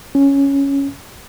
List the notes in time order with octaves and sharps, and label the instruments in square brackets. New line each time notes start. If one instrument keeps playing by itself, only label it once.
[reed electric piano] C#4